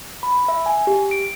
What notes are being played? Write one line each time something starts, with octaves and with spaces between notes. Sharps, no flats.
B5
E5
G#5
G4
D7